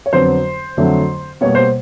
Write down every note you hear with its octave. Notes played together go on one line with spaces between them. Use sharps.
C#5
F2 D3 F#3 B3 C5
F2 D3 F#3 A3
B2 G3 A#3 C#5
C5